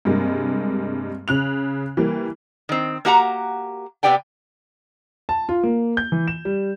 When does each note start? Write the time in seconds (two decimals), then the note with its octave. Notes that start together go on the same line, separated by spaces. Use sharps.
0.05 G2 C3 G#3 A#3
1.28 C#3 F#6 F7
1.97 E3 G3 A#3
2.69 D#3 C4
3.05 A#3 F#4 G4 F#5 G#5 A#5
4.03 C3 B3 G4 D5 G5 G#5
5.29 A5
5.49 F4
5.63 A#3
5.97 G6
6.12 E3
6.28 E7
6.45 G3